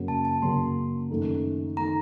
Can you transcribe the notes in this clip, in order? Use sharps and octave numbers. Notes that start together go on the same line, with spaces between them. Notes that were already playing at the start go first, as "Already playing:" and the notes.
Already playing: F#2 C#3 F#3 A#3
A5
A5
F#2 C#3 F#3 A#3 C6
F#2 D#3 A3 D#4
D#3 A3 D#4 A#5